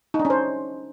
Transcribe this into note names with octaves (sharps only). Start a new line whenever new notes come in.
D#4
D4
C#4
C5